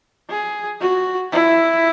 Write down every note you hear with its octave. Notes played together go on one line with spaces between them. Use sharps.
G#4
F#4
E4